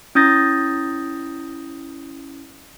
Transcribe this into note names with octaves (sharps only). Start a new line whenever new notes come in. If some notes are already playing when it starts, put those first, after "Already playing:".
C#4 E4 D#6 G6 A6 A#6